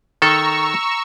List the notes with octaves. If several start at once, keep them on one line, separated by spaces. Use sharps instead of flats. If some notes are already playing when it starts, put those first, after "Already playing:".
D#3 A4 A#5 C#6 E6